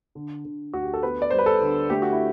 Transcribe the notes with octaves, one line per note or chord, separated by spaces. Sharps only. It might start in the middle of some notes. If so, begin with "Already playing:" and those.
D3
D3
D2 F#4
G4
A4
B3 B4
D5
G3 C5
B4
A4
D3
A3 G4
F#4
E4